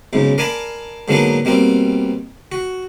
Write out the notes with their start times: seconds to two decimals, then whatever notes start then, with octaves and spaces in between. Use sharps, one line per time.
0.13 B1 G#2 C#3
0.38 A#4 D5 F5 G#5 A5 B5
1.08 G#2 D3 F#3 A#3 B3 D4
1.45 B2 G3 A#3 C4
2.52 F#4